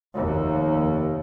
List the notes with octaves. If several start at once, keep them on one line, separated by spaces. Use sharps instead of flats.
F1 D#2